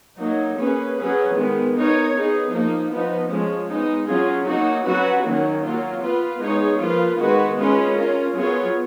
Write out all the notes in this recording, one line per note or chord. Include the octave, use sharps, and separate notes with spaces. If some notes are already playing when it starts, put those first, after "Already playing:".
F#3 A#3 D#4
A#3 C#4 G#4 B4
F#3 C#4 G#4 B4
D#3 G#3 B3
B3 D#4 A#4 C#5
B3 D#4 G#4
F3 A#3 D#4
F3 B3 D#4
F3 G#3 C#4
G#3 B3 D#4
F#3 C#4 F4 G#4
F#3 A#3 D#4 F#4
F#3 C#4 F#4 B4
D#3 F#3 A#3 C#4
F#3 A#3 F4
B3 F4 B4
G#3 B3 D#4 G#4 C#5
F3 A#3 F4 B4
D#3 G#3 B3 F#4 B4
G#3 C#4 F4 B4
C#4 F4 A#4
F#3 B3 F4 G#4 C#5